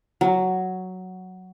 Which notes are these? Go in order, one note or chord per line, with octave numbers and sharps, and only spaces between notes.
F#3